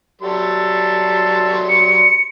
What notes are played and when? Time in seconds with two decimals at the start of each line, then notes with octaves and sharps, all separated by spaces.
0.22 F#3 G3 A4 C6
1.69 C#7